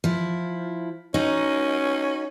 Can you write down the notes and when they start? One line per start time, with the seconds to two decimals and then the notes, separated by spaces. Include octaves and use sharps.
0.04 F3 E4
1.14 C#4 D#4 F#4